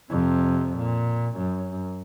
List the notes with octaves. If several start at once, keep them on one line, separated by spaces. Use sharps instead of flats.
F2 C3
A#2
F#2